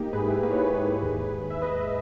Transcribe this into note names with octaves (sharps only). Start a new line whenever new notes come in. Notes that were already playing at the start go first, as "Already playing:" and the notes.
Already playing: A#3 D#4 G4
G#2 G#4 B4
E4 G#4
A#3 B4
C#5
G#4 B4
G#2
D#2
D#2
E5
D#2 B4 D#5